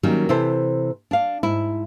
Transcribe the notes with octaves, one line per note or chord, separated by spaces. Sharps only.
D#3 F#3 G3 A#3 C#4
C3 E3 E4 A4 C5
D4 F5
G#2 E4